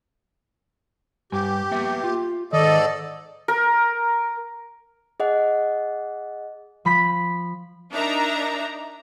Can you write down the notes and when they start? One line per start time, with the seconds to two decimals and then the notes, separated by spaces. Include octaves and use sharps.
1.32 G2 G4 G#5
1.71 A#3 B3 E5
2.04 F4
2.53 G#2 D#3 A4 D5 D#5
3.48 A#4
5.20 G#4 D#5 F#5
6.85 F3 B5 B6
7.93 D4 D#4 A#4 E5 A#5